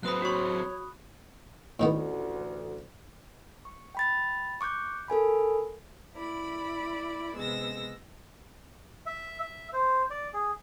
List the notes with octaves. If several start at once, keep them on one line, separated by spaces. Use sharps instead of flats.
F#3 C4 B4 B5 D#6 F#6
F#4 C#5 C#6
A1 D2 A2 D#3 B3
C#6
G5 B5 A6
C#6 D6 F#6 G6
A4 A#4 G#5 B5
E4 D5 B5
C3 G#3 B3 E6 A#6
E5
E5
C5
D5
G#4